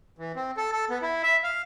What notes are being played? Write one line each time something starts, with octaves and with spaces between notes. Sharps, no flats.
E3
C4
A4
A4
B3
E4
E5
F5